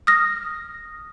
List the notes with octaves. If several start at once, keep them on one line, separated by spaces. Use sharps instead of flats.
D#6 F6 A#6